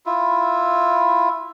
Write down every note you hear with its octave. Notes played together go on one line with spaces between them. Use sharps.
E4 F4